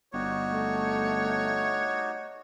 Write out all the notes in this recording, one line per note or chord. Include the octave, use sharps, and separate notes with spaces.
G1 D#4 F#4 G4 C#5
A3